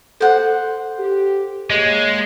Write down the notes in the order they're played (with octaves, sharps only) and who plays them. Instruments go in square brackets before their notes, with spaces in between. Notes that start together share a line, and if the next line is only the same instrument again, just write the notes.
[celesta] A4 [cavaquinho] C5 F#5
[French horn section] G4
[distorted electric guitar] G#3 [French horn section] A#3 C#5 [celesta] G#4 D#5